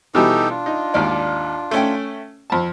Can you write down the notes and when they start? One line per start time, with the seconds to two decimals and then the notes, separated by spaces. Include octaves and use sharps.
0.15 B2 E3 G3 D#4 G4 A4
0.50 D4 F4
0.66 D#4
0.94 G#1 D#2 D5
1.71 A3 C#4 G5
2.50 F2 A5